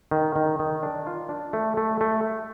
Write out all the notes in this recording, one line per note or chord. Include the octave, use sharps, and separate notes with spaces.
D#3
D#3
D#3
D4
F4
D4
A3
A3
A3